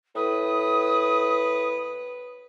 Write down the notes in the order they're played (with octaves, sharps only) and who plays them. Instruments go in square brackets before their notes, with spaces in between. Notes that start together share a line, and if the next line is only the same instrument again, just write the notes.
[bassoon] A2 [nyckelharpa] B4 [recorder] D#6